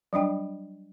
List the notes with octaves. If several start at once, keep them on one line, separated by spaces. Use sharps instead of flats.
F#3 G3 D4 G5